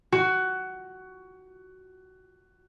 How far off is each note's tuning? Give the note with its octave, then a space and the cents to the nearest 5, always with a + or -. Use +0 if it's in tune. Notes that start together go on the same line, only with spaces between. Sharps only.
F#4 +15